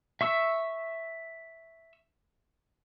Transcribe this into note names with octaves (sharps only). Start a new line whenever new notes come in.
E5 C#6 E6